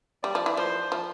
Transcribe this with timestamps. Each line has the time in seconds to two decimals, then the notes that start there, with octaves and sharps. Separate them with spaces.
0.23 G3 D5
0.35 F3
0.46 E3
0.57 F3 C5
0.92 F3